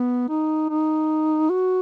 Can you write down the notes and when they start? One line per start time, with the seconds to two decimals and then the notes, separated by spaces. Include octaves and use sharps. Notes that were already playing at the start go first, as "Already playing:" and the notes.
Already playing: B3
0.29 D#4
0.69 D#4
1.50 F#4